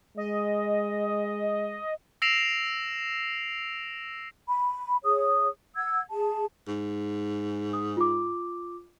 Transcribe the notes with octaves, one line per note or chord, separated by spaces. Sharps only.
G#3 D#5
E6 A#6 C7 D7 E7 F7
B5
G#4 C#5 D#6
F#5 E6 G#6
G#4 A5
G#2
D#6
F4 D6